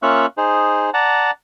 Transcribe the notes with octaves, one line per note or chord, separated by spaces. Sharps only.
A#3 C#4 F4 E5 C#6 F#6
D#4 G#4 C5
D5 F#5 A5 A#5